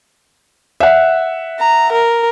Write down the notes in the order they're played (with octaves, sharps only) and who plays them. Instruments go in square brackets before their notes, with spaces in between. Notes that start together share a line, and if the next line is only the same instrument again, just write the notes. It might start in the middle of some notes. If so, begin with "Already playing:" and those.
[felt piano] E5 F#5
[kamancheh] A#5
A#4